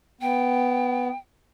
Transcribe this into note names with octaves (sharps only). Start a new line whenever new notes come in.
B3 G5